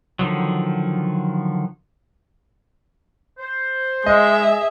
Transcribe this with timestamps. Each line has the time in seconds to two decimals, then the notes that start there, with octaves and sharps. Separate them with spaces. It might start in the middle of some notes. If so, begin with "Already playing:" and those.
0.19 D3 D#3 F3 F#3
3.38 C5
4.06 G#3 G#4 D#5 E5